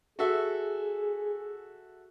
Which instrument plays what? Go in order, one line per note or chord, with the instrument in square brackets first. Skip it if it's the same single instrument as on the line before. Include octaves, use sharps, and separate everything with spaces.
[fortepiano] F#4 A4 E5 [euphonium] G#4